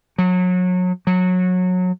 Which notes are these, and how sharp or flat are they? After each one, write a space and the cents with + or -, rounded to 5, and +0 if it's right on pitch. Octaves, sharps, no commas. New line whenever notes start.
F#3 -30
F#3 -20